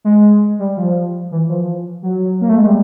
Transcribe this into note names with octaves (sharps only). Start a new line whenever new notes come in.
G#3
G3
F3
E3
F3
F#3
A#3
A3
G#3
G3